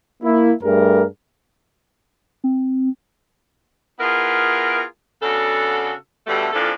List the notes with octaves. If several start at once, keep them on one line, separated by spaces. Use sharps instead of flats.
A#3 E4
G2 G3 A3 G#4 A#4
C4
B3 E4 F4 G#4 A#4
C#3 B3 D4 F#4 A4
B2 D3 G3 A3
F2 E3 F3 A#3 D4 A4